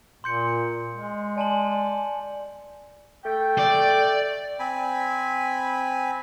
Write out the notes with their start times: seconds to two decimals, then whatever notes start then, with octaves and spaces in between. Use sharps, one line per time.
0.24 A#2 C6 G6 C#7
0.93 G#3
1.38 D5 G#5 A5 F#7
3.25 A3 A4 G5
3.58 D5
4.59 C4 G#5 B5